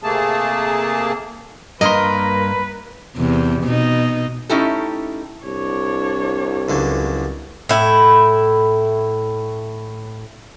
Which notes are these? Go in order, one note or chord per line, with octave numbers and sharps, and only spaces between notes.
C3 A3 A#3 G#4 A5
G2 A#3 A#4 B4 D#5 C6
E2 C3
B2 D#4
A3 C#4 D#4 E4 G4 A4
C2 D4 C#5
C#2 D3 F#3
A2 E4